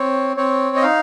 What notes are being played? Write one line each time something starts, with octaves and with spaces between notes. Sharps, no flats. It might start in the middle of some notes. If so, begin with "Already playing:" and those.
Already playing: C4 C#5
C4 C#5
D#5
D#4 F5